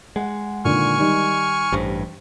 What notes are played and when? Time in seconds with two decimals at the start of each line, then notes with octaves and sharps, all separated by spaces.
0.16 G#3 F#5
0.65 A#2 D3 D#3 G#5 C#6 F6
0.98 D#3 G3 D#4
1.72 A1 G2 C5